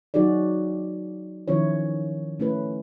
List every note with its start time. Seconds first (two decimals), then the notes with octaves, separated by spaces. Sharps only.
0.14 F#3 D#4 F#4 G#4 D5
1.48 D#3 F3 C#4 E4 C#5
2.40 A3 C#4 E4 B4